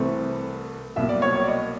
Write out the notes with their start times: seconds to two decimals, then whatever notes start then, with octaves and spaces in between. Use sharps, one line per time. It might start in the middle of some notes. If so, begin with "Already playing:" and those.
Already playing: C2 C3 E3 A3 C4
0.96 C2 B2 F#3 A#3 E5
1.09 D5
1.22 C#5
1.36 C#5
1.44 D5
1.48 D#5